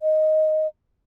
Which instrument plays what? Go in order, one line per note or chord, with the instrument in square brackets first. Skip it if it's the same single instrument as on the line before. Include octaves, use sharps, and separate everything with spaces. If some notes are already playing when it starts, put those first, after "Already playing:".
[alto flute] D#5